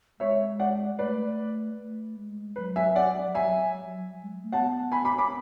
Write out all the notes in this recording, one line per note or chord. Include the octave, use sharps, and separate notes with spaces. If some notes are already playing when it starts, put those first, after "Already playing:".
G#3 C#5 E5
D5 F#5
A3 B4 D5
A3
G#3
F#3 B4
E5 G#5
D5 F#5
F#3 E5 G#5
F#3
G#3
A3
B3 F#5 A5
G#5 B5
B5 D6
B5 D6